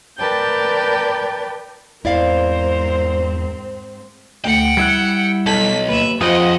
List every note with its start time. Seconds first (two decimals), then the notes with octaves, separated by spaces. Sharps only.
0.18 A#4 B4 D5 G5 A5 G6
2.05 E2 G#2 C4 E4 A#4 C5 D5 F5
4.45 D2 F#5 G5 C#7
4.77 G3 E4 F#6 G#6
5.46 B1 A4 A5 B6 F#7
5.88 D#2 B4 E5
6.21 F2 F4 G#4 C5 D#5 F#5 G5